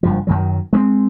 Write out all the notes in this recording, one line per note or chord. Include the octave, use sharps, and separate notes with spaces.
F#1 G2 F3
F#2 D#3 F#3
G#3 A3 C4